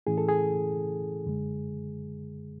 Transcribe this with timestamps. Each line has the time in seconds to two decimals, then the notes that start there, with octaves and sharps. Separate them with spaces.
0.07 A2 E3 A3 C#4 E4 G#4
0.18 A4
0.28 G#4
1.25 F#2 D3 G#3